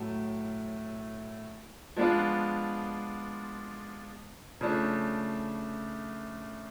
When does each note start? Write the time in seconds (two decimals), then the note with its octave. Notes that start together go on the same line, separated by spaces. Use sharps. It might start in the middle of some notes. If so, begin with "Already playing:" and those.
Already playing: A2 F#3 A3
1.96 F3 G#3 B3 D4 F4
4.61 C#3 F3 A3 D4